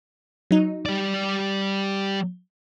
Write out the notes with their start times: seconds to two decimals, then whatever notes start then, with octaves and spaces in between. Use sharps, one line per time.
0.51 F#3 D#4
0.86 G3 D5